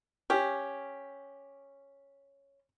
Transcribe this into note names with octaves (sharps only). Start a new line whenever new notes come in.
C#4 G4